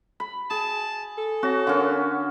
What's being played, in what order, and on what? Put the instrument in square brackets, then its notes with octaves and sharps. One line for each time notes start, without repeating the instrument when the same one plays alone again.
[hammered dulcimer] B5
[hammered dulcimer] G#4 [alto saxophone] A5
[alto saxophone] A4
[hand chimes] C4 C#5 A#6 [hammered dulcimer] F#4
[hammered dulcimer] D3 C#4 [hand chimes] A#4 F5